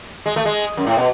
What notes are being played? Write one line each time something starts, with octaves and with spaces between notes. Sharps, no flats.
G#3
A3
G#3
F#2
A2
B2